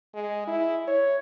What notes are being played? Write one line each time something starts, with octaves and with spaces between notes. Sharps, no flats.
G#3
E4
C#5